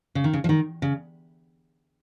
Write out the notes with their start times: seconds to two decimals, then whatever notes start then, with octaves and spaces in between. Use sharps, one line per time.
0.15 C#3
0.24 D#3
0.33 C#3
0.44 F3
0.49 D#3
0.82 C#3